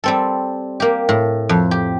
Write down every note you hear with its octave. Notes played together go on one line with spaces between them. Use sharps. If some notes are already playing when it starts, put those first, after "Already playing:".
G3 C4 A4
A#3 G4
A2
F2
G4